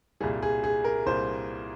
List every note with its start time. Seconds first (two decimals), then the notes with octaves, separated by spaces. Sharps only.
0.20 C2 A#2 G3 G#4
0.43 G#4
0.64 G#4
0.84 A#4
1.06 C2 A#2 G3 C5